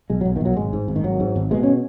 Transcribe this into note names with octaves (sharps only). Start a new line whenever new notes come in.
B1 G#3
F#3
B1
D#3
B1 F#3
G#1 G#3
G#2
G#1
D#3
G#1 F#3
G#2
G#1
B2 G#3
C#4